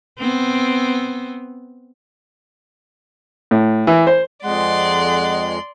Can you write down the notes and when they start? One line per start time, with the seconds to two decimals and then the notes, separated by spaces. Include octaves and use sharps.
0.19 B3 C4
3.51 A2
3.87 E3
4.07 C5
4.44 F2 G#3 D5 F#5 C6